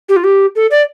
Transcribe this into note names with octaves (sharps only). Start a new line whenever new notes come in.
G4
F4
G4
A4
D5